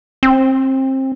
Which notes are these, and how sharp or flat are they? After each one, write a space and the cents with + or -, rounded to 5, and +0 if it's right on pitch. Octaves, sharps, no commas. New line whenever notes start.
C4 +25